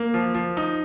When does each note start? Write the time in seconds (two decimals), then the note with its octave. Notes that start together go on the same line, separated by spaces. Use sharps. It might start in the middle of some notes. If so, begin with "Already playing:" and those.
Already playing: A#3
0.14 F3
0.35 F3
0.57 D#4